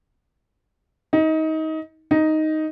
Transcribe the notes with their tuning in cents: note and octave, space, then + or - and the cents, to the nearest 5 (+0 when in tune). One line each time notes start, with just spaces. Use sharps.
D#4 +25
D#4 +5